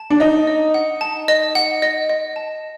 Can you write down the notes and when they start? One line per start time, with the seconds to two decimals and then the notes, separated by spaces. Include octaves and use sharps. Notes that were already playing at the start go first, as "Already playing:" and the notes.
Already playing: A5
0.10 D4
0.20 D#4 D#5
0.47 D#5
0.74 F#5
1.01 A5
1.28 D#5
1.55 F#5
1.82 D#5
2.09 D#5
2.36 A5